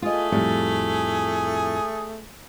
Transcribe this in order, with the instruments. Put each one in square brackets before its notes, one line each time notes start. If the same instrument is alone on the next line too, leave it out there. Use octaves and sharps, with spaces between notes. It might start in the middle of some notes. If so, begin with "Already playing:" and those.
[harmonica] A3 G#4 [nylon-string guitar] F4 D#5
[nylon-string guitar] F2 A2 G3